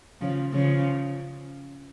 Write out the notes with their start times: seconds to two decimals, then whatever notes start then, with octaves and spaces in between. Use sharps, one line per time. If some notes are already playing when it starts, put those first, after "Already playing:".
0.21 C#3 F3
0.53 C#3 F3